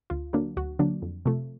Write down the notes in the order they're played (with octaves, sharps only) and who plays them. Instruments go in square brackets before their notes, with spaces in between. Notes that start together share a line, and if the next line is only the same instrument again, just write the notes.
[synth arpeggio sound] D2 F4
D3 F#3 A#3 D4
D2 F#4
D3 F#3 A#3 D4
F2
C3 F3 A3